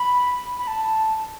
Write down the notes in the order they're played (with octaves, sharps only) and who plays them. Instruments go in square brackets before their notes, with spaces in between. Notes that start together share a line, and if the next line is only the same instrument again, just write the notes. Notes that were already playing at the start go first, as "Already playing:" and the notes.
Already playing: [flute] B5
B5
A5